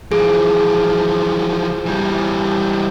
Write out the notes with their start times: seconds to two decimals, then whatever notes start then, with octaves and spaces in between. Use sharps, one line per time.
0.12 E3 F3 G#4
1.86 E3 G3